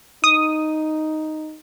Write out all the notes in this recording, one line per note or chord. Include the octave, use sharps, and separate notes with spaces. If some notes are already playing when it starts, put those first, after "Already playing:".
D#4 D#6